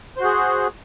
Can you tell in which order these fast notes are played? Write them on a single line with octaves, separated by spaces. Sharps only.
C5 F#4 G#4